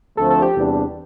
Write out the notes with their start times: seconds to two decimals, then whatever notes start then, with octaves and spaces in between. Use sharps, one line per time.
0.17 D2 D3 F3 A3 C4 A4
0.30 A4
0.42 G4
0.54 E2 C3 G3 D4